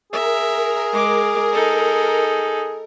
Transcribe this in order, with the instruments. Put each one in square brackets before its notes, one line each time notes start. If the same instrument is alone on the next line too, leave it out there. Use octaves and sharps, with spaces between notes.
[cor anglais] G#4 [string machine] A#4 [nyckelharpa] E5
[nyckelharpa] G#3 D6
D#4 A4